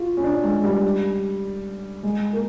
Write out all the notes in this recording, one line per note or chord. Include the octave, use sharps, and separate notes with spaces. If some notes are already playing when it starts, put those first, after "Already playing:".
Already playing: F4 F#4
C#4
D4
G#3
G3
G#3
A#3